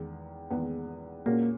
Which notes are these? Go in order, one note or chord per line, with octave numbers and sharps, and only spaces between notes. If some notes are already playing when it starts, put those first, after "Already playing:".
Already playing: E2 D#3 G#3 B3
E2 D#3 G#3 B3
A#2 G#3 A#3 C#4 F#4 A#4